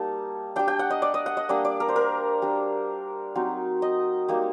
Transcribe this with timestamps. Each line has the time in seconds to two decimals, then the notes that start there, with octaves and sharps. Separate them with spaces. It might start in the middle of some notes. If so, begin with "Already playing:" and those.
Already playing: G3 A#3 D#4 A5
0.56 G3 D4 G5
0.68 G5
0.79 F#5
0.90 D#5
1.02 D5
1.14 D#5
1.26 F#5
1.37 D#5
1.49 G3 A#3 D4 D5
1.65 D5
1.80 A#4
1.89 C5
1.96 A#4
2.42 G3 D4
3.35 F#3 C4 D#4
3.82 D#5
4.28 G3 A#3 D#4